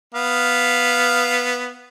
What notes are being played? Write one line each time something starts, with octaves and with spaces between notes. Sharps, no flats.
B3 F5